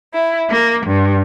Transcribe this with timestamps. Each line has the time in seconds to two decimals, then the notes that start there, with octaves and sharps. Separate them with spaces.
0.14 E4
0.51 A#3
0.87 G2